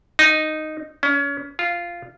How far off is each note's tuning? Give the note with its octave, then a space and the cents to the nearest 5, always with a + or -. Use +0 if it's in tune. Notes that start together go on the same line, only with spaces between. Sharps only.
D#4 -5
C#4 +30
F4 -10